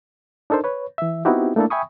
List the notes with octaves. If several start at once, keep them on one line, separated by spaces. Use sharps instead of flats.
D4 D#4 A4 A#4 C5
B4 C#5
E3 E5
B3 C4 D#4 E4 F#4 G4
A3 A#3 D4 E4 A4
E5 G5 G#5 B5 C#6 D#6